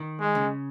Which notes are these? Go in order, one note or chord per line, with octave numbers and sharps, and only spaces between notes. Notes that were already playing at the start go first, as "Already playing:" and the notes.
Already playing: D#3
G#3
C#3